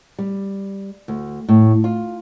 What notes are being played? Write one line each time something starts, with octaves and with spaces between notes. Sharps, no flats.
G3
D2
A2
F4